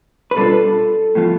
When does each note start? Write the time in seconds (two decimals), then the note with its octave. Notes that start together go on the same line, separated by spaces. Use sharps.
0.31 B4
0.36 B2 G3 B3 D4 F4 A4
1.15 A2 F3 B3 F4